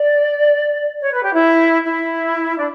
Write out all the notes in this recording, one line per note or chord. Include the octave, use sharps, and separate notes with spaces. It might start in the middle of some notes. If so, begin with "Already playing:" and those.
Already playing: D5
C#5
B4
G4
E4
E4
D4